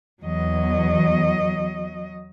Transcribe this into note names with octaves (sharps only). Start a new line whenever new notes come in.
E2 F#3 D#5